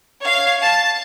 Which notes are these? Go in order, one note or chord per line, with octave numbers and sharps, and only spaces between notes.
C#5 F5
A5